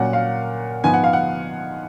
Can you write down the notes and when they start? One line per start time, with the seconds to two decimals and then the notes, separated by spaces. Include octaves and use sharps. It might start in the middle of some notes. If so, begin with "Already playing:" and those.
Already playing: A#2 F#3 C#4 F#5
0.13 F5
0.84 G#2 F3 B3 G#5
0.94 F#5
1.04 F5
1.13 F#5